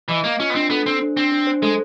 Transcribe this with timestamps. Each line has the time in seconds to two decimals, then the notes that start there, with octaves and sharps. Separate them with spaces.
0.08 E3 D#5
0.24 A#3 D#5
0.40 C#4 F4
0.50 B3
0.55 C4 D4
0.70 B3 A4
0.86 C4 C5
1.02 D4
1.17 C4 D4
1.32 D4
1.47 C5
1.62 G#3 A4